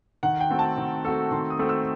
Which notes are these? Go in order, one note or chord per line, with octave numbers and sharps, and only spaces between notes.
D#3 F#5
G5
A3 C4 F#4 A4
A5
D#3
A3 C4 F#4 A4
D#3 C6
D#6
A3 C4 F#4 A4
E6